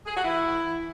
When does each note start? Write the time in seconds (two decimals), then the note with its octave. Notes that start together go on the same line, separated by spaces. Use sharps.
0.06 G#4
0.15 F#4
0.24 E3 E4
0.64 E3